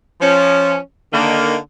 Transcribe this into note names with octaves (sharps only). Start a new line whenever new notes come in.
F3 C#4
D3 D#3 A#3